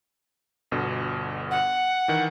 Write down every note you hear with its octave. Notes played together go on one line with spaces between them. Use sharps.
G1 B2 D3
F#5
D#3 E3